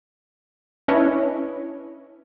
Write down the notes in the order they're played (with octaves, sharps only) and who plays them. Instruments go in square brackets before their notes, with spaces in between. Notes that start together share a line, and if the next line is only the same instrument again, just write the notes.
[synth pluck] C#4 D4 E4 B4 C#5 D#5